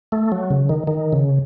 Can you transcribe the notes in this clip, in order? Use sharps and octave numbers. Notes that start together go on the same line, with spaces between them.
A3
F#3
C#3
D#3
D#3
C#3